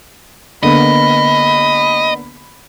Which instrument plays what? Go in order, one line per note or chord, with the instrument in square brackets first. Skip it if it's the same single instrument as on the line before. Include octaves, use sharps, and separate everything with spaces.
[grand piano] D3 A#3 B3 [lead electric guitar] D#5 [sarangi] B5